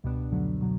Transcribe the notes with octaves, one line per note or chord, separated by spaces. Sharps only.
C#2 B2 G3 B3 D4
F2 D3 F#3 A3
B2 F#3